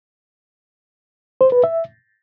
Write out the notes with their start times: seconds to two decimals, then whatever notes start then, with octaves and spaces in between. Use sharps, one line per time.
1.41 C5
1.52 B4
1.64 E5